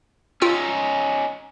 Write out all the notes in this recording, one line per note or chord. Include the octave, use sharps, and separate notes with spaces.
C#4 D#4 F4 G5 E6